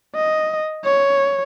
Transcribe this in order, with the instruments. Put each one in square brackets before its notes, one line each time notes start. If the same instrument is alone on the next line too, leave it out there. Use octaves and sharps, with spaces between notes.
[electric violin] D#5
C#5